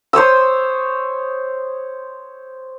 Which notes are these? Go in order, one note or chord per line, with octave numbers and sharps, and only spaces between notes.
C5 C#5 D#6 E6